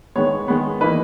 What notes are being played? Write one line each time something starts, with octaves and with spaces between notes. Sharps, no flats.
D#3 G#3 B3 C#5
D#3 G#3 B3
E3 A#3 D#4 B4